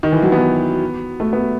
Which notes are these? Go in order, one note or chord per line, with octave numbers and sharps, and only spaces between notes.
D#3
E3
F#3
B3
A3
B3